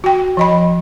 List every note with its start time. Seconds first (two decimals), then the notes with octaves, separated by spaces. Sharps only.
0.04 F#4 G5
0.37 F3 D#5 B5